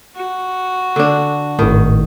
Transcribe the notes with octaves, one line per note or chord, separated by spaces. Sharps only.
F#4
D3 D4
G#1 A2 D#3